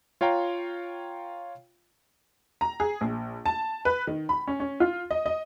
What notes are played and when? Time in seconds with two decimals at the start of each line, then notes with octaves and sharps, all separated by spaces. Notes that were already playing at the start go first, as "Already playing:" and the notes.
0.21 F4 C#5 F5 G5 A#5
2.61 A#5
2.80 G#4
3.01 A#1
3.46 A5
3.85 B4
4.07 D#3
4.29 B5
4.47 C#4
4.60 C#4
4.80 F4
5.11 D#5
5.26 D#5